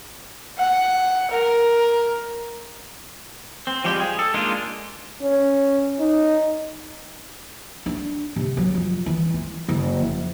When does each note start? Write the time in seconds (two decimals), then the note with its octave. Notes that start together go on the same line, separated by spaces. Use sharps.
0.59 F#5
1.31 A#4
3.67 C4
3.84 F3 G3 G#3 G4
4.00 G#4
4.19 A4
4.34 G#3 A#3 D4 D#4 F4
5.22 C#4
6.00 D#4
7.86 D4
8.36 C3
8.57 F#3
8.75 F2
9.06 E3
9.34 F4
9.69 F#1
10.00 F2